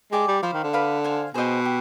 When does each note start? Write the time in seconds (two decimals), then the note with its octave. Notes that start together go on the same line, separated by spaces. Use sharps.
0.12 G#3 G4 D5 G#5
0.28 G3
0.42 F3 C5 F5 B5
0.53 D#3
0.64 D3
0.73 B4 D5 F5 B5
1.04 C5 F5 G#5
1.34 B2 G#4 C5 D#5 G5
1.66 G4